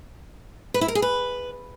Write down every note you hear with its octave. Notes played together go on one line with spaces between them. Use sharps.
B4
E4
A#4
G#4
B4